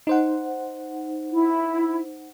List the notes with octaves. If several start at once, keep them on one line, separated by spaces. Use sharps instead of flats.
D#4 C5 F#5
E4